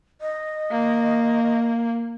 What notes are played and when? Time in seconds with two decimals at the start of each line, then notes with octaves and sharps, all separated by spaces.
0.21 D#5
0.71 A#3